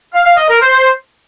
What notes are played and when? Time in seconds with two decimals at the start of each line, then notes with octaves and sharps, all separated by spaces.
0.13 F5
0.25 F5
0.37 D#5
0.49 A#4
0.61 C5